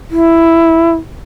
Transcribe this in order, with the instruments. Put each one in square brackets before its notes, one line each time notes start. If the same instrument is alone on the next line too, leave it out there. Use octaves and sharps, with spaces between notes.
[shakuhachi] E4